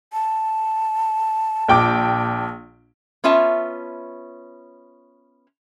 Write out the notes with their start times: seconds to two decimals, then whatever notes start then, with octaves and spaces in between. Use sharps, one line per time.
0.13 A5
1.68 A#1 G5 D6
3.24 B3 C#4 F4 E5 A5